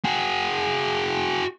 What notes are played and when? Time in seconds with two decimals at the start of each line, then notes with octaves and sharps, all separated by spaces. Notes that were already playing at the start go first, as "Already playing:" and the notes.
0.05 F#4 G#4